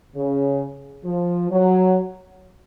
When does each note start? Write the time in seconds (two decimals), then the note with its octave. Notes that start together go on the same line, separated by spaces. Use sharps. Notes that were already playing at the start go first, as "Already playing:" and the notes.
0.15 C#3
1.04 F3
1.50 F#3